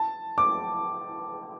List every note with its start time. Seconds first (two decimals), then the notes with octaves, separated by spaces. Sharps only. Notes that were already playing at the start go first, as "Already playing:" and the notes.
Already playing: A5
0.38 D6